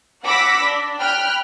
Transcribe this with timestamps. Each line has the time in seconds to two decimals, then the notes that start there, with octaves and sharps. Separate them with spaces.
0.24 F#5 B5 D6 E6 A#6 B6
0.62 D4
1.00 G5 B5 F6 F#6